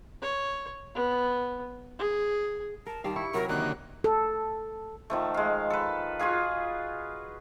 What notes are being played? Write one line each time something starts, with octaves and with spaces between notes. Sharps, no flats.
C#5
B3
G#4
A#4 A5
D#3 G3 F5 A5
E4 C#6
C3 F#3 A#4
D3 D#3 A#3 F#6
A4
D#3 F3 A3
G#3 F5
A4 B4
F4 F#4 G#4 F5